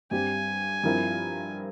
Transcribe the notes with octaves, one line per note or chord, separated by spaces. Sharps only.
G2 G3 C4 G4 G#5
G2 F3 C4 E4 A#4